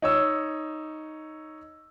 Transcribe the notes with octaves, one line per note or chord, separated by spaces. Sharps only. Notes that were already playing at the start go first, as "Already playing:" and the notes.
D#4 C#5 E6